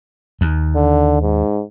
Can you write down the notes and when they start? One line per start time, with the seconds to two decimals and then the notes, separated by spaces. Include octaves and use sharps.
0.41 D#2
0.75 D3
1.22 G#2